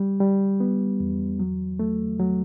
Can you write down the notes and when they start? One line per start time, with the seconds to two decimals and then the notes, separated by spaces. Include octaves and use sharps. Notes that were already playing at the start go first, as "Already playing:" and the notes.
Already playing: G3
0.20 G3
0.60 B3
1.00 E2
1.40 F#3
1.79 A3
2.19 F#3